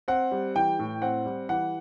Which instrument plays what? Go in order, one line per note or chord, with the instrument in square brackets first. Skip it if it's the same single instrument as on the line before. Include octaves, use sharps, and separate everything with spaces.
[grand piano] C4 F#5
G3
E3 G5
A2
C4 F#5
G3
E3 F#5